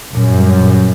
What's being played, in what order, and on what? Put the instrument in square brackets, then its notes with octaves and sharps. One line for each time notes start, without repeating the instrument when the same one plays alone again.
[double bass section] F#2 [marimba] A#2
[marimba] G3
A#2